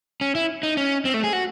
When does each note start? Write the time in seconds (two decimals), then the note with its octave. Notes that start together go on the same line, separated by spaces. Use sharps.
0.21 C#4
0.35 E4
0.63 D#4
0.77 C#4
1.05 C4
1.14 A3
1.24 G#4
1.33 F#4